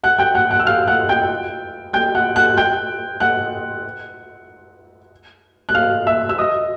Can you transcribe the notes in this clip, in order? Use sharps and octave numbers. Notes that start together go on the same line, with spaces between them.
F#5 F#6
G5 G6
F#5 F#6
F#5 F#6
E6
F5 F6
F#5 F#6
G5 G6
G5 G6
F#5 F#6
F#5 F#6
G5 G6
F#5 F#6
F#6
F5 F6
E5 E6
E6
D#5 D#6